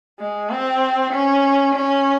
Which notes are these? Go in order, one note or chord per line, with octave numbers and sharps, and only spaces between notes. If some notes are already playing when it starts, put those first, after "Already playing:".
G#3
C4
C#4
C#4